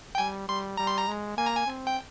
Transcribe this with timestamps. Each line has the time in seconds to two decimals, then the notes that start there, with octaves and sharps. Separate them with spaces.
0.15 G5
0.18 G3 G#5
0.48 G3 C6
0.77 G3 A#5
0.87 C6
0.98 A#5
1.08 G#3
1.38 A#3 G#5
1.46 A#5
1.56 G#5
1.67 C4
1.87 G5